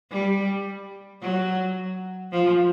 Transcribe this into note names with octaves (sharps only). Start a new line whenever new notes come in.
G3
F#3
F3